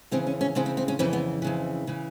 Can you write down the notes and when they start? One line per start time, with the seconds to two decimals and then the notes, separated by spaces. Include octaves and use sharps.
0.11 F2 C#3 E3 C4
0.27 C#4
0.41 C#4
0.55 F2 C#3 E3 C4
0.66 C4
0.77 C4
0.88 C#4
0.99 F2 C#3 E3 C4
1.13 B3
1.42 F2 C#3 E3
1.87 C#3 E3